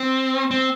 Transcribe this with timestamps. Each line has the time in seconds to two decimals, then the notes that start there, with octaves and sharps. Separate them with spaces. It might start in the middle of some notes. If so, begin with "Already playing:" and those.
Already playing: C4
0.51 C4